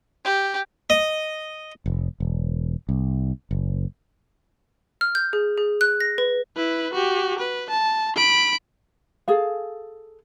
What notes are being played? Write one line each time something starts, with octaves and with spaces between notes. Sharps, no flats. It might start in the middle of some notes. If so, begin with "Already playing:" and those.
G4
D#5
F1
E1
C2
F#1
F6
G6
G#4
G#4
F#6
A#6
B4
E4 B4
F#4 G4
B4
A5
B5 D7
G#4 A4 F5